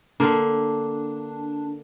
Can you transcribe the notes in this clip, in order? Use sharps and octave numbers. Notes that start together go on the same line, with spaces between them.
D3 A#3 D4